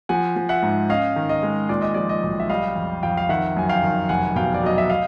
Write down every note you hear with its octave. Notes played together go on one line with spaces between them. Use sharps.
F3 F#5 G#5
F3
E5 F#5
G#2
C#4 D#5 F5
D#3
D#5
G#3
A#2 D5
D#5
F3 D5
D#5
B1
E5
G3 D#5 F5
F2
F2 F5 G5
F5
D#3 E5 F#5
F#2 G#5
F5 G5
D#3
F1 F#5 G#5
B2 F5 G5
D5
F#3 D#5
E5
D#5 F5